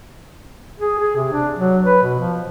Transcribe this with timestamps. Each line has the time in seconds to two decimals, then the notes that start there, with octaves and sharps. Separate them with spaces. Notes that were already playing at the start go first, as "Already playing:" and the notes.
0.80 G#4
0.99 G#4
1.16 C3
1.32 D4
1.58 F#3
1.85 B4
2.02 B2
2.19 F3